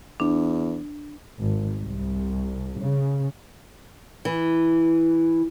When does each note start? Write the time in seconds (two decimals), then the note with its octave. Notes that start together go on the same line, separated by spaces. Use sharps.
0.20 E2 D4
1.39 G#1
1.78 C2
2.79 C#3
4.25 E3